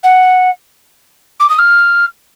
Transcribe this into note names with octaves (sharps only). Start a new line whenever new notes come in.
F#5
D6
D#6
F6